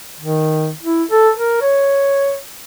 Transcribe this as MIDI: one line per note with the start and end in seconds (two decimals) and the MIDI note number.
0.20 0.71 51
0.83 1.04 64
1.11 1.30 69
1.37 1.61 70
1.61 2.36 73